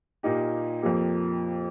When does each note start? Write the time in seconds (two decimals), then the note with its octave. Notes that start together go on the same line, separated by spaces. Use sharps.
0.23 A#2 A#3 D#4 G4
0.82 F2 F3 A#3 G4